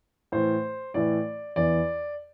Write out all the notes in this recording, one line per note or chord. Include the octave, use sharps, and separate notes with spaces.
A2 E3 C5
A2 E3 D5
E2 E3 D5